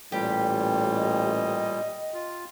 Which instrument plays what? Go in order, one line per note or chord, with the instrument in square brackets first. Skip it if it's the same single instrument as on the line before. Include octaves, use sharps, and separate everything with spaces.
[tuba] A1 [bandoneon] A#2 G3 [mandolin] G4
[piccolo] D#5
[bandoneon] F4